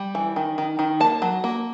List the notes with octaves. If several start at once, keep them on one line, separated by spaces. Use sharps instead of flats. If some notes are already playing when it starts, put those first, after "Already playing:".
Already playing: G3
E3
D#3
D#3
D#3
A#3 A5
F#3
A#3